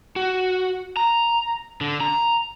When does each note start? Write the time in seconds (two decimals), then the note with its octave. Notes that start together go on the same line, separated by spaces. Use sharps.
0.16 F#4
0.97 A#5
1.81 D3
2.00 A#5